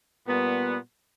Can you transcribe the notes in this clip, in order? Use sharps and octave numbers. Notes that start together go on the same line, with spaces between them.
A#2 G3 B3